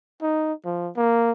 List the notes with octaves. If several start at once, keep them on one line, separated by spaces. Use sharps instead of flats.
D#4
F3
A#3